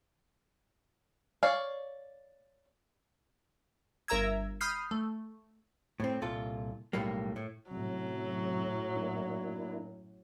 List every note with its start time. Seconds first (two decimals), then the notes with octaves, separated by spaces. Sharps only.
1.43 C#5 D5 F5
4.08 G1 A#4 E5 A#5 E6 G#6
4.61 B5 D#6 F6 G6 C7
4.91 A3
6.00 A2 C4
6.22 C2 A#2 F4 A4
6.93 B1 A2 G3 A#3
7.36 A2
7.71 F#2 A2 C3 F#3
8.96 A#3 D4 E4